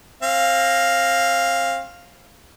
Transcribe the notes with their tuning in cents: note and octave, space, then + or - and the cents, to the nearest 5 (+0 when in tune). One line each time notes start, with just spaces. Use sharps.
C4 +35 F5 +0